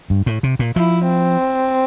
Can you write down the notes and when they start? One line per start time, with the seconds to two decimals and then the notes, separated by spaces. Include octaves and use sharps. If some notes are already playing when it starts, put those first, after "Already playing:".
0.10 G2
0.26 A2
0.43 C3
0.59 A#2
0.76 F3 E4
1.10 C4